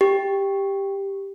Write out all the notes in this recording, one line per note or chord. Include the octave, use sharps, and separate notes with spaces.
G4